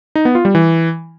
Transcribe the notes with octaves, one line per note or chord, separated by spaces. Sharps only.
D#4
B3
F4
G3
E3